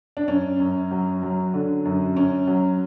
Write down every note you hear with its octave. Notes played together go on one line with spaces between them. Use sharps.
D4
F#2 C#4
F#2
F#3
F#3
D3
F#2
F#2 C#4
F#3